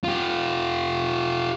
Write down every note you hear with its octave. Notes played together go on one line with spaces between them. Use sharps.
F4 G4